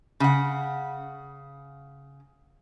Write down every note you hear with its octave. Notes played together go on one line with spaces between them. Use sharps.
C#3 F#5